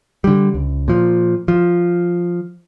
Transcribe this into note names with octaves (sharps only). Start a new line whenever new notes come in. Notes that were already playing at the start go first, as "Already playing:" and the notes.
D3 G3
C#2
A#2 F3
F3